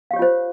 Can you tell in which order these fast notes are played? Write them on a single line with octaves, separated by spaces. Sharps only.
F5 G4 C#5 F4 C5